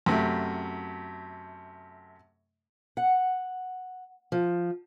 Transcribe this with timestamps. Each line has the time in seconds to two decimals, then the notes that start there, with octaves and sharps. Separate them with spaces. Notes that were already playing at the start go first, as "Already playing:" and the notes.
0.06 F#2 C3 A3
2.97 F#5
4.32 F3